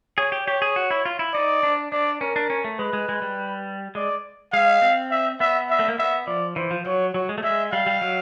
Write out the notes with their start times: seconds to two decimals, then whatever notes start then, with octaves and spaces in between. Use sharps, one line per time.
0.18 G#4 C#5
0.32 G4
0.46 G4 C#5
0.62 G#4
0.76 F#4
0.91 E4
1.06 F4
1.19 E4
1.34 D#4 D5
1.63 D4
1.92 D4 D5
2.21 C#4 A#4
2.36 D4
2.50 C#4
2.64 A3
2.79 G#3 B4
2.93 G#3
3.09 G#3
3.22 G3
3.95 G#3 D5
4.53 G#3 F5
4.82 C4
5.11 E5
5.40 B3 E5
5.70 E5
5.79 A3
5.88 A#3
5.98 B3 E5
6.27 F3 D5
6.56 E3 C5
6.71 F3
6.86 F#3 C#5
7.14 F#3 C#5
7.29 G#3
7.38 A3
7.43 G#3 E5
7.72 G3 F5
7.86 G3
8.01 F#3